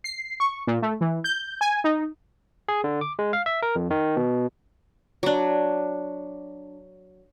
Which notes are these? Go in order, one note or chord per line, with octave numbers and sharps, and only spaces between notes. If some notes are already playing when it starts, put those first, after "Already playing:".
C7
C#6
A#2
A3
E3
G6
G#5
D#4
G#4
D3
D6
G#3
F5
E5
A#4
F2
D#3
B2
F#3 D4